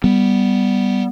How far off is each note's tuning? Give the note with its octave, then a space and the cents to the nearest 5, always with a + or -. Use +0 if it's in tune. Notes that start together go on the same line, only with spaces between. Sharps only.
G3 +0 B3 +0